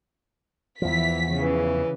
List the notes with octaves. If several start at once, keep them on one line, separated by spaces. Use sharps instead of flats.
E2 E3 F3 B6
C#3 E3